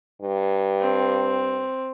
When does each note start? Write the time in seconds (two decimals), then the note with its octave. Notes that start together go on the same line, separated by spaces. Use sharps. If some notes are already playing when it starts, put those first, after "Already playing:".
0.22 G2
0.81 C4